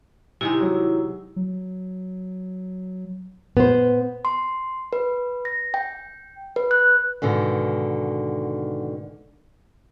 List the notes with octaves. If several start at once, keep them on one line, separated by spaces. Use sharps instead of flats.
C3 D#3 G#3 E4 G4 E6
F#3
F#3
A#2 B3 C5
C6
B4
A#6
G5
B4
F#6
G#2 B2 D3 D#3